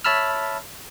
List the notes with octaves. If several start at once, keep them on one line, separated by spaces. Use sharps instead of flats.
C#5 E5 A5 B5 E6 F6